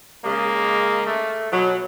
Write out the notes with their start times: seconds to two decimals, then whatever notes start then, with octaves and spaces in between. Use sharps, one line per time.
0.24 C#3 G#3 A#3
1.06 A3
1.52 B2 F#3